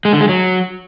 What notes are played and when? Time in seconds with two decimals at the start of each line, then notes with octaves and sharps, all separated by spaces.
0.05 G#3
0.13 D3
0.21 G#3
0.29 F#3